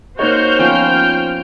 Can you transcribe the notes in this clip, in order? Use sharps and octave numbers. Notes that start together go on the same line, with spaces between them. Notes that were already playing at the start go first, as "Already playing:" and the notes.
A#3 D#4 F#4 C5 C#5 F6 G6
F3 B3 C#4 G5